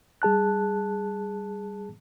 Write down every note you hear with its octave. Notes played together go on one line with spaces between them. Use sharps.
G3 G#4 A5 F#6